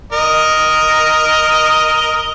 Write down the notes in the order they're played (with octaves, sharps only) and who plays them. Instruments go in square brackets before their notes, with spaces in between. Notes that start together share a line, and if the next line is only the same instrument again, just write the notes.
[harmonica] A#4 D#5